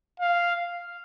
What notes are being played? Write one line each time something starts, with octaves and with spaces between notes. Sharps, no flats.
F5